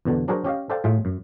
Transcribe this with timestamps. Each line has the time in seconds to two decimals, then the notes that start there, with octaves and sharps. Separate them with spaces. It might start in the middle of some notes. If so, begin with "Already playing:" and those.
0.05 E2 B2 D3
0.28 F#3 D4 F#4 G#4 A#4 C5
0.44 C#4 G4 D#5 F5
0.70 A4 C5 D5 F5 G5 A5
0.84 A2 F4 G#4 E5
1.05 F#2